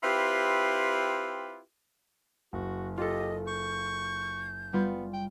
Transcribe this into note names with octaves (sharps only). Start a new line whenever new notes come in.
C4 E4 F4 G4 B4
F#1 F#4
F4 G4 A4 D#5
C#6 G6
G3 B3 F4
G5